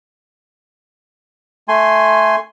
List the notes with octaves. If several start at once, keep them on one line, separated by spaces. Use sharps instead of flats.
A3 G#5 C6